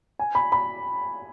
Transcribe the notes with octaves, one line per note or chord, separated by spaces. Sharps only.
G#5
B5
B5